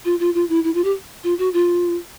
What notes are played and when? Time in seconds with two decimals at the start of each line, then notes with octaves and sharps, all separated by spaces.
0.05 F4
0.20 F4
0.34 F4
0.49 E4
0.64 E4
0.74 F4
0.84 G4
1.24 F4
1.39 F#4
1.53 F4